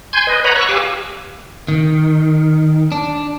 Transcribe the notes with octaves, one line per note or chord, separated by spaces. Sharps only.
G#5 C6 G6 G#6
B4 D#5
B4 C#5 F#5 A#5 B5
C#6 E6 F#6
G4 F5 G#5 D6 E6
D#3
D4